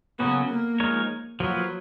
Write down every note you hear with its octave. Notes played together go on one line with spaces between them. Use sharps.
C#3 F#3 A#3 B3 C#4 F#4
A#3
F3 G#3 D#4 A#4 C#5
F3 F#3 A#3 F4 B4